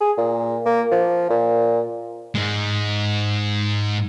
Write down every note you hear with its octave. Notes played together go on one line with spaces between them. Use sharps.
G#4
A#2
A#3
F3
A#2
G#2 G#3